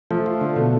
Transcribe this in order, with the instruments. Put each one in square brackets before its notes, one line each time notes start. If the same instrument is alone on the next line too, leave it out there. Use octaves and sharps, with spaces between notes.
[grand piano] F3 [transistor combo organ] A3
[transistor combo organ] F4
D3
[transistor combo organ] B2 [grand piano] A3